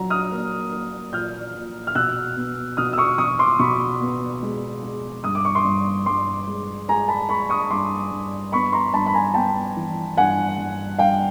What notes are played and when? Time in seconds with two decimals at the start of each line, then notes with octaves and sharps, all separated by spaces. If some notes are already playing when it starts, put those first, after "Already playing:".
Already playing: A#2 F#3 A#5
0.10 D#6 F6
0.32 A#3
0.72 A#3
1.13 A#2 F6 G6
1.54 A#2
1.87 F6
1.95 B2 E6 F#6
2.36 B3
2.77 B2 D#6 F6
2.93 E6
2.98 C#6 D#6
3.18 B2 C#6 D#6
3.39 C6 D6
3.59 B2 B5 C#6
4.00 B3
4.43 G#3
4.83 G#3
5.24 G2 D#6
5.35 D6
5.45 C#6
5.55 C6 D6
5.65 G2
6.06 G2 C6 D6
6.47 G#3
6.89 G#3 G#5 A#5
7.08 A5 B5
7.29 G#3 B5 C#6
7.49 C#6 D#6
7.70 G2 C6 D6
8.11 G2
8.52 B3 B5 C#6
8.73 A#5 C6
8.93 G2 A5 B5
9.07 B5
9.14 G#5 A#5
9.34 B3 G5 A5
9.76 E3
10.17 G2 F#5 G#5
10.58 G2
10.98 G2 F5 G5